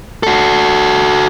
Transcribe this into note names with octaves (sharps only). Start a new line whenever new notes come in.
F#4 A4